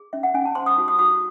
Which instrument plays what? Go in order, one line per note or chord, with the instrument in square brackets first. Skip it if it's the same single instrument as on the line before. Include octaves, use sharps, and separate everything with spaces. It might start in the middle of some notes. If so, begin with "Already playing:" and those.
Already playing: [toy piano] G#4
C#4 E5
F#5
C#4 G#5
A5
C5 C6
D#6
F#4
D#6
F#4 D#6